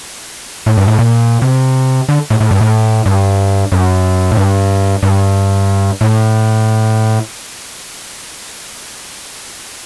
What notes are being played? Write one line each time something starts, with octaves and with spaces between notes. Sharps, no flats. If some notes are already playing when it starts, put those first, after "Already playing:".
A2
G2
A2
A#2
C3
D3
A2
A2
G2
A2
G2
F#2
A2
G2
G2
A2